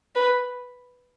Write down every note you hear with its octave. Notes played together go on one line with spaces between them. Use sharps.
B4